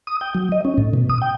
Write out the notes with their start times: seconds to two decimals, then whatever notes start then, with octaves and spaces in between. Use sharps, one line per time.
0.07 D#6
0.21 G5
0.34 F#3
0.52 D#5
0.65 C#4
0.78 A2
0.94 B2
1.10 D#6
1.22 G5